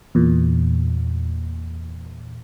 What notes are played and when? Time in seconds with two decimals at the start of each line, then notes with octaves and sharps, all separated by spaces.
0.15 E2 A#2